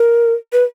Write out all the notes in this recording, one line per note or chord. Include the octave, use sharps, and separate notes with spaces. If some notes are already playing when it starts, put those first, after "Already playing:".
Already playing: A#4
B4